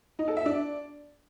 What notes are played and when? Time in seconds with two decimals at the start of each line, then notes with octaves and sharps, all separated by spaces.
0.19 D#4
0.28 A4
0.37 E5
0.46 D4